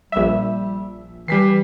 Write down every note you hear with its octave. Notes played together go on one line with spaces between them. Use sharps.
A#1 G3 E5
E3 G3 B6 C7